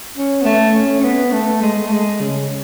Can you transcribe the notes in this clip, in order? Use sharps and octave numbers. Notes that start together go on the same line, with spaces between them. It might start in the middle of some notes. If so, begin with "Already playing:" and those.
C#4
B3
A3
C#4
C#4
B3
A3
G#3
A3
G#3
C#3